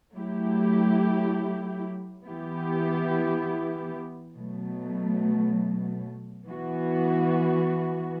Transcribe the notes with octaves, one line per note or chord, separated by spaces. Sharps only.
F#3 A3 E4 G4
E3 B3 E4 G4
B2 F#3 A3
E3 B3 F#4